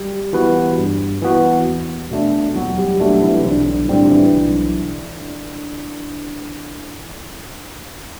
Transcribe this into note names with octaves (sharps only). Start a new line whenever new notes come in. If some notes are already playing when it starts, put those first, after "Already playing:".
Already playing: G3 G4
E3 B3 F#4 B4
G2
E3 B3 F#4 B4
E2
B2 A3 D4
E2 F#3 F#4
G3 G4
B2 F#3 A3 D4 F#4
E3 E4
C4
B1 D3 D4
D3 D4
A2 D3 G3 C4 D4
D4
E3 E4
B1